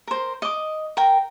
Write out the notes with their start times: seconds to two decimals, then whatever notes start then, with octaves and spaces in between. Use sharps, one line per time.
0.08 A#4 C5
0.42 D#5 D6
0.97 A#4 G5